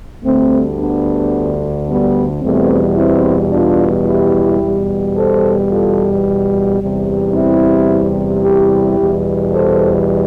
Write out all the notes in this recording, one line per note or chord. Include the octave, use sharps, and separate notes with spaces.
D2 D3 G3 A3 C4
B3 D4
G3 B3
E2 B2 G3 A3 C4
C4 E4
D4 F4
E4 G4
E2 B2 G3
A4 C5
F4 A4
E2 C3 G3
C4 E4
E4 G4
E2 B2 G3
A4 C5